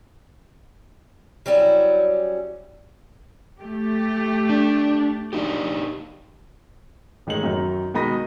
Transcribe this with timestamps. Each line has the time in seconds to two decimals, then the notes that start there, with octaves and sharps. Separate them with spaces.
1.46 F#3 G3 C#4 E4
3.61 A3 G4
4.50 D4
5.33 D4 D#4 G4
7.27 A1 D#3 G#3 A3 G#4 F#7
7.43 F#2 D#3 F#3 D#4
7.94 B2 D#3 G#3 B5 D#6 A#6